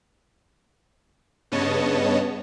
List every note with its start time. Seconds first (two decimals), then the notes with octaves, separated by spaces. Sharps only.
1.52 G2 C#3 B3 C#5 D#5 A5